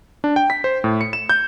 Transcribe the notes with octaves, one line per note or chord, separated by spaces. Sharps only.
D4
G5
B6
C5
A2
C#7
E7
G6